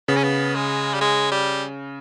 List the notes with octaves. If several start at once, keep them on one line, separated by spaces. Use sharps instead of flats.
C#3 B3
C#4
B3
G#3
G3
G#3
G3